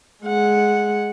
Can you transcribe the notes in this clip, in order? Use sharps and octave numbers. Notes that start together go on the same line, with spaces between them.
G#3 F#5